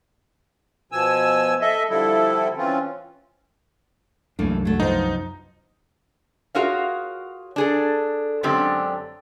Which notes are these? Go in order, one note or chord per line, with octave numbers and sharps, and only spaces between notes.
B2 F3 G#5 E6
A4 D#5 E5
D3 F3 G3 E4 A4
E3 C4 C#4 F4
C2 F#2 E3 A3 A#3 D4
F#3 A3
F3 B3 D#4 C5
F4 F#4 G#4 A#4 C#5 F5
D4 G#4 A4
F#2 D3 G#3 C4 D4 G4